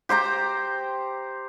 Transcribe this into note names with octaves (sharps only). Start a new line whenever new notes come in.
G4 C5 G5 A#5